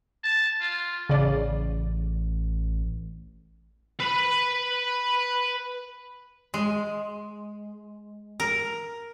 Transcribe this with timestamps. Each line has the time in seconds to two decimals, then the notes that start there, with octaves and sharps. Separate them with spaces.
0.23 A5
0.60 F4
1.09 A1 C#3 D5
4.00 B4 B5
6.54 G#3
8.40 A#4